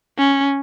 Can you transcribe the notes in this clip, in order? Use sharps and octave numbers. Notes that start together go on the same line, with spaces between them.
C#4